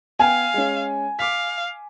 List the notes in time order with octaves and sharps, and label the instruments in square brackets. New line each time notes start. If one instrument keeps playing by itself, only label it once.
[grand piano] B3 G5 [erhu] F5 [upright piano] G#5
[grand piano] G#3 C#4
[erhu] F5 [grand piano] D6 B6